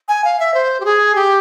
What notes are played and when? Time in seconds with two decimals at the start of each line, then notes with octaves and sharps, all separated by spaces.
0.08 G#5
0.24 F5
0.40 E5
0.54 C5
0.80 G4
0.85 G#4
1.15 G4